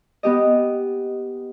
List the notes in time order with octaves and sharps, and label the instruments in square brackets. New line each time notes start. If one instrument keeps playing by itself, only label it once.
[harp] B3 G4 D#5